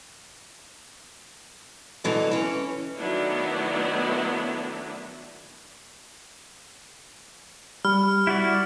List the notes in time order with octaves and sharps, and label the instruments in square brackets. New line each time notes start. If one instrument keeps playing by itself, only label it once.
[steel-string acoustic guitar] B2 D3 E3 F#3
E3 C#4
[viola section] D#3 F#3 A3 B3 D4 E4
[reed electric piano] G3 [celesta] B5 [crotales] F6
[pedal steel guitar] E4 F#4 D5